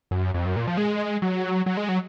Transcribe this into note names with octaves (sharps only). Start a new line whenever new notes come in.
F#2
F2
F#2
A#2
F3
G#3
F#3
F#3
G#3
F#3